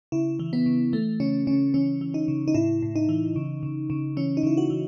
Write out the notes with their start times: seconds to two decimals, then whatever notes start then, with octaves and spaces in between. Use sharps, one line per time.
0.12 C#3 E4
0.39 E3
0.53 B3
0.66 C#3
0.93 E3 A3
1.20 C#3 C#4
1.47 C#3 C#4
1.74 E3 C#4
2.01 E3
2.14 D#4
2.28 C#3
2.48 D#4
2.54 A2 E4
2.82 A2
2.96 D#4
3.09 E3
3.36 C#3
3.63 C#3
3.90 C#3
4.17 E3 C#4
4.37 D#4
4.43 C#3 E4
4.57 F#4
4.70 E3